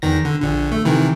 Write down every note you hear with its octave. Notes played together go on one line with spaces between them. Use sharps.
E2 D#3 A#6
D3
A#1 D3
A3
C3 D#3 E3